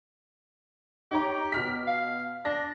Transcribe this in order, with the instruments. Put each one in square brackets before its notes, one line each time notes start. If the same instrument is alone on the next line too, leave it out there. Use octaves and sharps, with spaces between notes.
[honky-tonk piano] D#4 C#5 A#5 [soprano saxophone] G4
[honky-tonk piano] B2 F6 B6
[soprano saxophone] F5
[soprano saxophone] D4 [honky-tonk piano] A#6